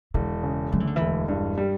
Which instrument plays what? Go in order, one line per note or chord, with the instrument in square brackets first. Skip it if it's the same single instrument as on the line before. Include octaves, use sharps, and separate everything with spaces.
[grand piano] E1 [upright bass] D3
[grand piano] C#3
[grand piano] D2 [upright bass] F#3
[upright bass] E3
D3
E3
[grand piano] E1
G2
G3